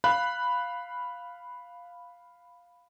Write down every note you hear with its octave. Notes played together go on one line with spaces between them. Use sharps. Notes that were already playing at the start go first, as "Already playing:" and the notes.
F5 B5 F#6